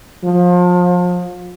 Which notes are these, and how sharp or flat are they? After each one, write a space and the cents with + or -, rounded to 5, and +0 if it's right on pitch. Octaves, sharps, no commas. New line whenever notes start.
F3 +30